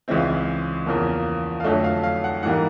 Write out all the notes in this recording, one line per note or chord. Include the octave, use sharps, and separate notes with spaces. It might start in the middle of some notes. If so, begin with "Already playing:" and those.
C#2 C#3 E3 G#3 C4 E5
F5
E5
E2 C#3 F3 A#3
F5
F2 D3 F#3 A3 E5
F5
F5
F#5
G#2 E3 G3 A#3 F#5